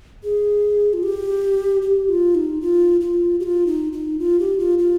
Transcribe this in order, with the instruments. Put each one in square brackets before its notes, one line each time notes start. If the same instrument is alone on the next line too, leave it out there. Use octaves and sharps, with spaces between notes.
[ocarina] G#4
F4
G4
G4
F4
D#4
F4
F4
G4
F4
D#4
D#4
F4
G4
F4
F4